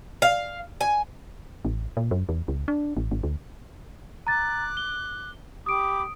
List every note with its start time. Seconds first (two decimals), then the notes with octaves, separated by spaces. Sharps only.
0.22 F5
0.81 G#5
1.65 A1
1.97 A#2
2.11 F#2
2.29 E2
2.48 C#2
2.68 D4
2.97 A1
3.11 G#1
3.23 D2
4.27 A#5 D6 F#6 A6
4.77 G7
5.66 G4 B5 D6 D#6 D7